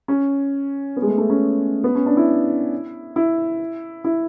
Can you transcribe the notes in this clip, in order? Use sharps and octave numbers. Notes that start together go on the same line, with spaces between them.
C#4
B3
G#3
A3
A3
C#4
B3
C#4
D4
E4
E4
E4